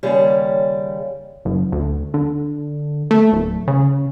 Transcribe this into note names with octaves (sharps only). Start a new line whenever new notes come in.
D#2 C#3 G3 C#5
F#1
D2
D3
A3
D1
C#3